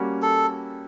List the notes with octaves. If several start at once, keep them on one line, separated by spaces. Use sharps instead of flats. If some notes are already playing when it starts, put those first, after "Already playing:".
Already playing: G3 A#3 C#4 F#4
A4